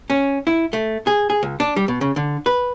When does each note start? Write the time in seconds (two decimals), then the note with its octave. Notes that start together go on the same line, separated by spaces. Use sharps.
0.10 C#4
0.47 E4
0.73 A3
1.07 G#4
1.30 G#4
1.43 C#2
1.60 D4
1.76 G3
1.88 B2
2.01 C#3
2.16 D3
2.46 B4